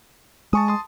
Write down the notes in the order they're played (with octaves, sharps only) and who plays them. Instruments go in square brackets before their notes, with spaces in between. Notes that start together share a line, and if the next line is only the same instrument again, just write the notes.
[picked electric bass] G#3 [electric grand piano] A5 C#6 D#6
[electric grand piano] A5 C6 D#6